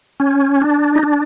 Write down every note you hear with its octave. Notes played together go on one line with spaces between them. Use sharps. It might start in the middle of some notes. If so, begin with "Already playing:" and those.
C#4
D4
D#4
D4